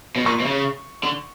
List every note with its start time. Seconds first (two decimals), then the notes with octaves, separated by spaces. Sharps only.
0.16 B2
0.26 A#2 C#6
0.40 B2
0.45 C#3
1.03 D3